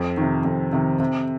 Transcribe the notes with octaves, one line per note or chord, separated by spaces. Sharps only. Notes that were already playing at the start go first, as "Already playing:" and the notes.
Already playing: F2
C3 D#3
F2
C3 D#3
C3